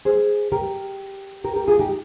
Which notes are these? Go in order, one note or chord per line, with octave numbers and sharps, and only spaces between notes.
G#4 C5
G4 A#4
G4 A#4
G4 A#4
F4 G#4
D#4 G4